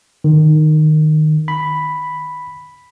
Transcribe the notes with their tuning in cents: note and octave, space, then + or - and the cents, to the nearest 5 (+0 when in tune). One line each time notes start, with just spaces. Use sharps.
D#3 -15
B5 +0